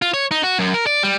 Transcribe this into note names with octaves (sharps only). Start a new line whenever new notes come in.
F4
C#5
D#4
F#4
F#2
A#4
D5
G3